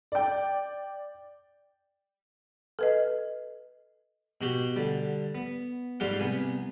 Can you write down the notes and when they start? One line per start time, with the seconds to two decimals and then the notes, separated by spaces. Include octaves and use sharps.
0.12 D5 G5
2.79 A4 B4 D#5
4.41 B2 F#4 G4
4.76 D3 G3
5.35 B3
6.00 G#2 G3 F4 G4 F#5
6.20 C2 B3 G#5